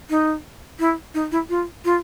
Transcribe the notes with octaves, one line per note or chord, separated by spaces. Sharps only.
D#4
E4
D#4
E4
F4
F4